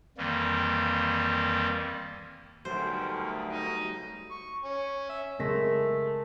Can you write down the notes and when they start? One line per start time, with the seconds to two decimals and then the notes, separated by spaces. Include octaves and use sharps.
0.17 F2 D#3 E3 G3 A#3
2.65 D2 B2 D#3 F#3 G3 A3 C5
3.51 D#4
4.31 C#6
4.64 C#4
5.09 E5
5.40 C#3 F#3 G#3 A3 A#4 A#6 B6